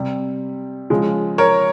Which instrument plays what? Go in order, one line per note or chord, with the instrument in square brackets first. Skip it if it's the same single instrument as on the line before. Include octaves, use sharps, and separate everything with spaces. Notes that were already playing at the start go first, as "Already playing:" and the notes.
Already playing: [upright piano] C3 G3
C#3 F3 G#3
A#4 C#5